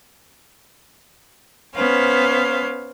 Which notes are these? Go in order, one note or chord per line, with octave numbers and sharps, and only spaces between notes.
B3 C#4 C5 F5